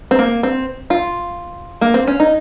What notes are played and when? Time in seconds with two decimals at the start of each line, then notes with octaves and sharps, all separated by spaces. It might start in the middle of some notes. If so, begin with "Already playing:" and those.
0.11 C4
0.19 A#3
0.43 C4
0.90 F4
1.81 A#3
1.94 C4
2.07 C#4
2.20 D#4